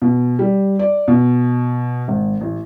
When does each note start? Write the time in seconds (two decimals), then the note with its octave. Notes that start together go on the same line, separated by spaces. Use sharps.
0.02 B2
0.39 G3
0.79 D5
1.08 B2
2.08 G#1
2.41 A1